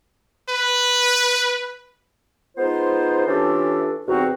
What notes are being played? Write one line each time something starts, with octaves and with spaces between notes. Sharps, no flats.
B4
G#3 B3 D#4 F4 C5
E3 C#4 D4 F4 G4 A4
E2 C3 C4 D#4 F#4